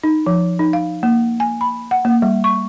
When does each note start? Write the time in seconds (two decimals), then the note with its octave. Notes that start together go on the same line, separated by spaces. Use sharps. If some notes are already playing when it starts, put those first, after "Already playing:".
0.04 D#4
0.26 F3
0.59 D#4
0.73 F5
1.03 A#3
1.40 G#5
1.61 B5
1.91 F#5
2.05 A#3
2.22 G3
2.44 C#6